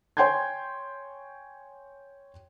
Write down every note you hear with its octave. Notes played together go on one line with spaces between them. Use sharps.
C#5 G5 G#5 C6 G6 G#6